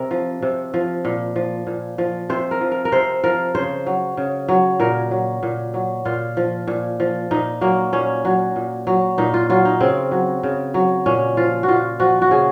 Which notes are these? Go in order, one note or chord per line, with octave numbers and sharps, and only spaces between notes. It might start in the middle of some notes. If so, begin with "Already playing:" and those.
Already playing: C3 A#4
F3
C3
F3
A#2
F3
A#2
F3
C3 C5
A#4
F3
A#4
A#4
C3 C5
F3 A#4
C#3 C5
F#3
C#3
F#3
A#2 A#4
F#3
A#2
F#3
A#2 F4
F3
A#2
F3
A#2 D#4
F#3 A#3
A#2 C#4
F#3
A#2
F#3
A#2 D#4
F4
F#3 F4
D#4
C#3 C4
F#3
C#3
F#3
A#2 C#4
F3 F4
F#4
A#2 F4
F3 F#4
F#4
C#3 G#4